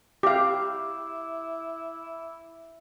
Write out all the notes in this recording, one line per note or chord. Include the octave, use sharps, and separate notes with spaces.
E4 G4 F5 D6